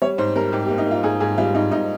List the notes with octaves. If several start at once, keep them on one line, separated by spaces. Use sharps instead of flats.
G3 C#5
G#2 C5
G3 A#4
G#2 G4
G4
A#3
D#4
A#3 F4
G#2 G#4
G#2 G#4
G3 F4
G#2 D#4
G#2 D#4